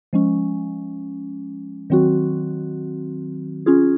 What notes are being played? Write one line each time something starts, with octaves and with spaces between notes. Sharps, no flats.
F3 G#3 C#4
D#3 F#3 C4 F#4
C#4 F4 G#4